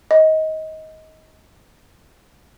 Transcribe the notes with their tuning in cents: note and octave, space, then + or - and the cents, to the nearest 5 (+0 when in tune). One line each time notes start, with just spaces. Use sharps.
D#5 +20